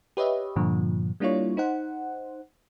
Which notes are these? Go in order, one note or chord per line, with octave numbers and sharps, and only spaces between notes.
G4 B4 C#5 D#5 E5
G2 A#2 D3 F3
G3 A#3 D4 E4 F4 C#5
D#4 C5 F#5